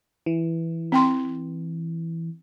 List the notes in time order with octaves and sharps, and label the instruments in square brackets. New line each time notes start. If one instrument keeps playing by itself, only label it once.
[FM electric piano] E3
[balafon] C4 G5 C6